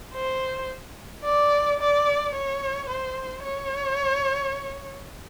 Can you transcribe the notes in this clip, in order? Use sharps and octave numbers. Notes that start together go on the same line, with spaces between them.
C5
D5
D5
C#5
C5
C#5